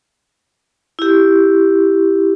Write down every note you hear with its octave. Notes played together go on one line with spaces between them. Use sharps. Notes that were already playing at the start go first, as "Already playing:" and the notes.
E4 G4